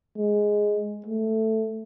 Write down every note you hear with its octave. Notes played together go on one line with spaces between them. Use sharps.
G#3
A3